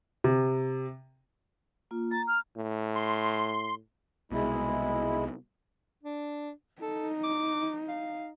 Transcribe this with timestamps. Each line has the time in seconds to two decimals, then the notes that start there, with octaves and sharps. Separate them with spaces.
0.24 C3
1.91 A#3 F4
2.11 A#5 A6
2.28 F6
2.57 A2
2.96 C6
4.32 C2 B2 G#3 E4
6.03 D4
6.82 D#4 A4
7.24 D6
7.89 F5